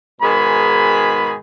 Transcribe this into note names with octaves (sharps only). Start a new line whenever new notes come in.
G#2 B2 D#3 G#4 B5